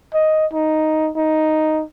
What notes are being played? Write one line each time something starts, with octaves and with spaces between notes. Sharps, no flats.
D#5
D#4
D#4